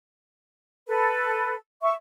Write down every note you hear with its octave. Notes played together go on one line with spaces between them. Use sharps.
A4 B4
E5 C#6